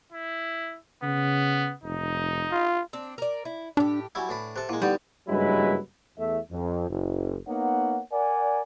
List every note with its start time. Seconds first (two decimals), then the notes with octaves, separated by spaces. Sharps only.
0.13 E4
1.03 C#3 B3
1.83 F1 D#4
2.51 F4
2.93 C4 D4
3.18 A#4 D5
3.45 E4
3.77 A2 D4 G4
4.15 F#3 G3 E4 G#5 E6
4.29 A2 D4 B4 B5
4.56 C3 A4 F#6
4.69 A#2 G#3 E4 F#5
4.82 D3 G3 B3 D#4
5.28 F#1 G2 F#3 G#3 E4 B4
6.18 E2 A3 E5
6.51 F2
6.90 F#1
7.48 A#3 B3 D#4 C#5 F#5
8.12 A#4 D5 F#5 G#5